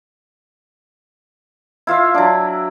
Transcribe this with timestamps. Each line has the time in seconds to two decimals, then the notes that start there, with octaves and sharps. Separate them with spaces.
1.87 E4 F4 E5 F5
2.14 F#3 D4